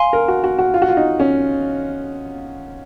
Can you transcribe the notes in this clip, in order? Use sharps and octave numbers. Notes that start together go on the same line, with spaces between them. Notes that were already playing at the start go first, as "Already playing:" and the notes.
Already playing: F5 G#5 C6
A#4
F#4
F#4
F#4
F4
F#4
F4
D#4
C#4